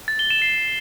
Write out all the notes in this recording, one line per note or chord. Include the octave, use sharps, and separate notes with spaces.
A6
G7
E7
C7